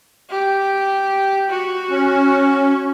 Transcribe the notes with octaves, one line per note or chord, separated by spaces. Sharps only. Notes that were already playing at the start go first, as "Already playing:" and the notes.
G4
F#4
C#4